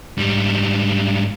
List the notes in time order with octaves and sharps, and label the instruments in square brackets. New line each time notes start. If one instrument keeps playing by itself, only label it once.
[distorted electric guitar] G#2 G3